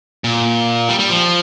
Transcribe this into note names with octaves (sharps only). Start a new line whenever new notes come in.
A#2
G3
G3
F3